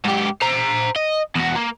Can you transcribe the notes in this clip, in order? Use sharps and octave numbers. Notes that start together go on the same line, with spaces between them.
G#2 G4
C5 A#5
D#5
E2 F#4
A#3